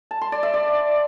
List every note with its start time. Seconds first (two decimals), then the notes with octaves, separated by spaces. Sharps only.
0.11 A5
0.21 C6
0.32 D5
0.43 E5
0.54 D5